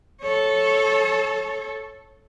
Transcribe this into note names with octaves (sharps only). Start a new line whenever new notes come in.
A4 C#5